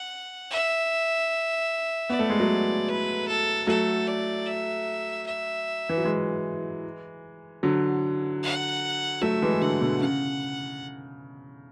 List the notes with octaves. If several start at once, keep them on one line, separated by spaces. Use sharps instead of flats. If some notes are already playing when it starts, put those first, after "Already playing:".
Already playing: F#5
E5
B3 D5
A3
G#3
F#3 A3
B4
A4
F#3 A3 A4
D5
E5
E5
E3
F#3
E3 G#3
D3 F#3
F#5
F#3 A3 E5
E3 G#3
D3 F#3 F#5
B2 D3
C#3 F#5